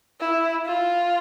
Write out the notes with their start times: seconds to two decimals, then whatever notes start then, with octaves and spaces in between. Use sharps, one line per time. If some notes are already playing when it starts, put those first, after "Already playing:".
0.20 E4
0.65 F4